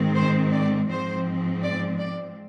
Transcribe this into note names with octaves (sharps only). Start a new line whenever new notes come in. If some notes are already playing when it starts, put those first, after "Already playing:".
Already playing: G#2 D#3 G#3 C4
C5
D5
G#2 F3 G#3 C4 C5
D5
D5